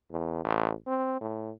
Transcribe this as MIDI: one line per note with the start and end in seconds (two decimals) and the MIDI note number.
0.11 0.40 40
0.44 0.72 33
0.87 1.18 60
1.21 1.51 45